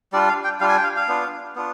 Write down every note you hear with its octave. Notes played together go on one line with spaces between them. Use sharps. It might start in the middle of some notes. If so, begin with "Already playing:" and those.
G3 D4 F4 D5
F5
G5
G3 D4 F4 F5
G#5
G5
F5
F5
B3 D4 F4
B3 D4 F4